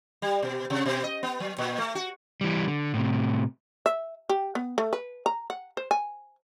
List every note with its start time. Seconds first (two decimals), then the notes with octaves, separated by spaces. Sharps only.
0.22 G3
0.43 B2
0.70 C3
0.86 B2
1.04 D#5
1.23 B3
1.40 F#3
1.58 A#2
1.78 A3
1.95 F#4
2.41 E3 G3
2.68 D3
2.94 A2 C3
3.86 E5
4.29 G4
4.55 B3
4.78 A3
4.93 B4
5.26 A#5
5.50 F#5
5.77 C5
5.91 G#5